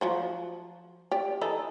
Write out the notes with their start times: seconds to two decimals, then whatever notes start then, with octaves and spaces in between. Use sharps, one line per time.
0.01 F3 F#3 C5
1.11 G4 D5
1.41 E3 D#4 A4